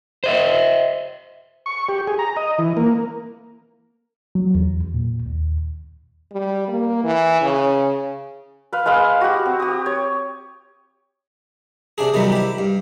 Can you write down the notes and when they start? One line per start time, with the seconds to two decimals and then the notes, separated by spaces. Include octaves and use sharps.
0.24 C5 D#5 E5
1.66 C#6
1.89 G4
2.08 G#4
2.19 A#5
2.37 D#5
2.59 E3
2.77 A#3
4.35 F#3
4.55 E2
4.94 A#2
5.26 D#2
6.32 G3
6.68 A#3
7.03 E3
7.42 C#3
8.73 B4 F5 B5
8.86 G#3 B4 F5 E6
9.21 F#4 G4
9.45 C4
9.60 G4 D#6
9.86 C#5
11.98 C3 D4 G#4
12.14 C3 D#3 E3 F#3 G3 B3
12.32 E4 G4
12.59 G2